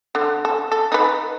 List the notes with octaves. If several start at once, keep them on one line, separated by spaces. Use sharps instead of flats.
D3
A4
A4
D#4 B4